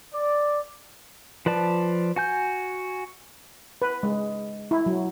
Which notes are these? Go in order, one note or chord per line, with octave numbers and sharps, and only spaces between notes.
D5
F3 B4 D5 A5
F#4 G#5 G6
B4
G#3
E4
F#3